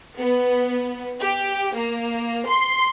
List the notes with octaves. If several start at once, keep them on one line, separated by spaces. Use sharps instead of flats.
B3
G4
A#3
C6